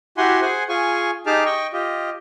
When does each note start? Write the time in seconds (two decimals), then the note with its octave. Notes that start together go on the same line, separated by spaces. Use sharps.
0.18 E4 F#4 G4 F#5 G#5 C6
0.41 G#4 C5 F#5 G#5
0.69 F4 G#4 G#5 C#6
1.26 D#4 G4 G#4 A5 D6 F6
1.45 D#5 G5 C#6
1.73 F4 G4 D#5